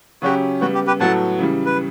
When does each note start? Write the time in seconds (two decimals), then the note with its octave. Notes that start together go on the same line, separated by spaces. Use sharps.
0.22 C#3 F#3 C#4 F#4 G4
0.61 C#3 G3 B3 F#4
0.74 G4
0.87 G4 B4
1.00 A2 F#3 B3 F#4 A4 F#5 A5
1.39 C#3 E3 G3
1.66 B4